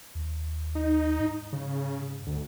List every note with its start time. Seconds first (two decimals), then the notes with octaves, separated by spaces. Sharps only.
0.15 D#2
0.75 D#4
1.20 G#2
1.53 C#3
2.27 D2